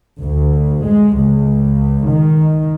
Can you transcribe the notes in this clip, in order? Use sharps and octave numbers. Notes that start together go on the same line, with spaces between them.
D2
G#3
C#2
D#3